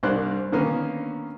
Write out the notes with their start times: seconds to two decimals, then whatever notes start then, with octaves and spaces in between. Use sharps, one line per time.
0.03 C2 G2 A#4 C5 D5 F#6
0.52 D3 D#3 A#3 B3 C#4